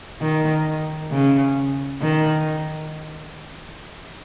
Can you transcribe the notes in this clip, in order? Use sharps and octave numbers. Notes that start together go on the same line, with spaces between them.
D#3
C#3
D#3